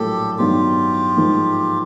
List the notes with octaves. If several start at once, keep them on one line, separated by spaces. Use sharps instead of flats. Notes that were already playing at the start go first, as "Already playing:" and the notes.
Already playing: A#1 A2 F#3 A#3 G4 A4
G2 D#3 F#3 B3 D#4 F4 G4
G#2 F3 A#3 D#4